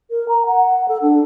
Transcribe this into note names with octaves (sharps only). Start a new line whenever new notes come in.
A#4
A#5
F#5
A4
D4